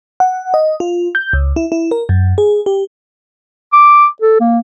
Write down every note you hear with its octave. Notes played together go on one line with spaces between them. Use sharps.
F#5
D#5
F4
G6
C#2
E4
E4
A#4
F#2
G#4
G4
D6
A4
A#3